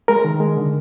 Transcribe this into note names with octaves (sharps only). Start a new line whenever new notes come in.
G#3 A#4
D#3
G#3
D3